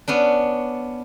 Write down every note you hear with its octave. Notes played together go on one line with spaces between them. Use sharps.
B3 C#4 D4